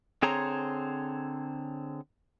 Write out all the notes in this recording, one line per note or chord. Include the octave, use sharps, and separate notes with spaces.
D3 C4 G#4 C5 C#5 A#5